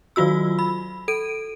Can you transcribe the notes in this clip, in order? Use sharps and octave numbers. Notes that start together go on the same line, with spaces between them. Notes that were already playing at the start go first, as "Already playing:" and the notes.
D#3 F#3 F4 F#4 E6
B5
A4 D7 D#7